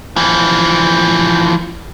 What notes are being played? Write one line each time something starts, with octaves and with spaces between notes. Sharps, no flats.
E3 F3